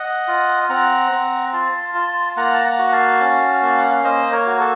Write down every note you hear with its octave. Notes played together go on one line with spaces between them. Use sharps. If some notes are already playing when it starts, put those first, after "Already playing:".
Already playing: D#5 F#5
F4
C4 F#5 A#5
C4
F4 A5 C6
F4
A#3 F#5 A#5
A5
F#5 A#5
F#4
F#5
F5 A5
C#4
A#3 A5
F#5
F5
A#3 C5 D#5
A#4 C#5
F#4
A4